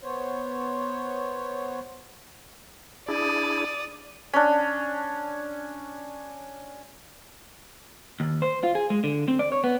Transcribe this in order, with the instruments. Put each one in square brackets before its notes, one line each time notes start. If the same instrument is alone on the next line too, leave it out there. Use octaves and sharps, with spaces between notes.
[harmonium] B3 C5 C#5
[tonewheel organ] D4 E4 G#4 [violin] D5 D#6
[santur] C#4 D4
[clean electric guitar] D#2
C5
F4
G#4
G#3
D3
C4
D5
C#5
B3